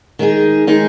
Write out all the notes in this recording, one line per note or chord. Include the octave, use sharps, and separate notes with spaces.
D#3 G#3 D#4 G#4
D#3 G#3 D#4 G#4